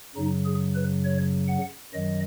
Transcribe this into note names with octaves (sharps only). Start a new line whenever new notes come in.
F#2 C#3 F#3 D#4
G#4
B4
C#5
F#5
F#2 D#3 F#3 D#5